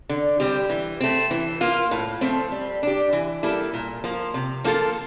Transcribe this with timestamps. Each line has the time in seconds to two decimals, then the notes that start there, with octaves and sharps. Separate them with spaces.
0.09 D3
0.40 G3 C4 G4
0.70 E3
1.00 A3 C4
1.31 E3
1.61 A#3 F4
1.91 A2
2.21 F3 A3 C4
2.52 G3
2.83 D4 G4
3.13 E3
3.43 G3 A#3 E4 A4
3.73 A#2
4.04 F3 A#3
4.34 C3
4.64 F3 A#3 F4 A4